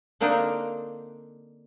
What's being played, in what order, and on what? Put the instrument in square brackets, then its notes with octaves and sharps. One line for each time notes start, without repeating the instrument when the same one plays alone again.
[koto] D3 A#3 C4 D4 D#4